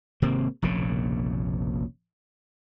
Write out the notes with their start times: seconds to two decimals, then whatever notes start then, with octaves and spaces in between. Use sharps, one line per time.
0.22 G#1 C3 A#3 C4
0.62 F1 A#1 A#2 C#3